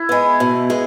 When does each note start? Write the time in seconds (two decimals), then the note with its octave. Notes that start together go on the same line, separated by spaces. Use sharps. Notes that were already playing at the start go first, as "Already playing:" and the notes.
Already playing: E4
0.09 G#3 B3
0.40 B2
0.70 G#3 B3